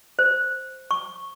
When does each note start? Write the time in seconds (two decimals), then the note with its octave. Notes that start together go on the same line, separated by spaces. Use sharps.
0.19 C5
0.91 C#6